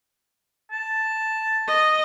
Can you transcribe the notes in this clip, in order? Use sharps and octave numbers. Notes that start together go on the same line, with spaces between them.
A5
D#5